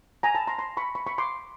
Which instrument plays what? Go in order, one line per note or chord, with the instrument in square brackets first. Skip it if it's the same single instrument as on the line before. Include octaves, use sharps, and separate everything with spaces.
[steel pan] G#5 A#5
A5 B5
A#5 C6
A#5 C6
B5 C#6
B5 C#6
B5 C#6
C6 D6